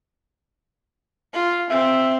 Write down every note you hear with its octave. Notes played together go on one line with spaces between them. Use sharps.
F4
C4 E5